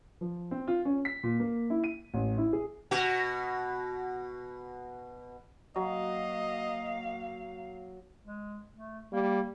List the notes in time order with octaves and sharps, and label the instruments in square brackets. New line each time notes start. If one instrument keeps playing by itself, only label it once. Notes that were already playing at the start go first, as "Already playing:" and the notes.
[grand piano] F3
C4
F4
C#4
B6
A#2
A#3
E4
D#7
A1
E4
G#4
[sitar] B2 F#4
[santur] F#3 [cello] A#3 F5 [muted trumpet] D#5
[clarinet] G#3
A3
[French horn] G3 [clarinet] A#3